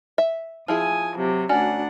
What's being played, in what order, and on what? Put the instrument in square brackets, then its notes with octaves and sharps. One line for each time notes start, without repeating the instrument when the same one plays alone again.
[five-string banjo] E5
[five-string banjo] F3 E4 G#4 [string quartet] G#5 D#6
[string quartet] C3 F#3
[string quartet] D2 D4 F#5 [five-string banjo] C#4 F#4 D5